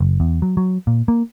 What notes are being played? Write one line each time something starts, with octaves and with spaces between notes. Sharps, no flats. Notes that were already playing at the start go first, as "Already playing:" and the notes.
F#1
E2
F#3
F#3
A#2
A#3